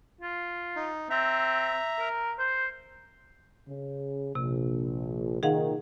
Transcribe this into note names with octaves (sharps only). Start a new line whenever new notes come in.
F4
D#4
C4 E5 A#5
A#4
C5
C#3
A#1 C3
A#2 D#3 G#4 F5 F#5